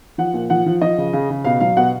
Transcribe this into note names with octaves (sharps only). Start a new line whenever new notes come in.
F3 F#5
A#2
F3 F#5
F3
F3 D#5
C#3
C#3
C#3
B2 F5
F#3 F5
B2 F#5